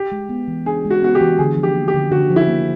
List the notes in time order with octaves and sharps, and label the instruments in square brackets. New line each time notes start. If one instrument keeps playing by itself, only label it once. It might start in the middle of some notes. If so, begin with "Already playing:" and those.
Already playing: [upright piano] G4
[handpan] G#3
B3
E3
[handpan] D4 [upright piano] G#4
[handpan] G#3
[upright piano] F#4
[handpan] B3 [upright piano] F#4
[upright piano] G4
[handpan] E3
[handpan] D3 [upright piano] G#4
[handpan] F3
[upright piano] G4
[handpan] A#3
[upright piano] G4
[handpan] D3
[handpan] D3 [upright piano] F#4
[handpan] F3
[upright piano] E4
[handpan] A#3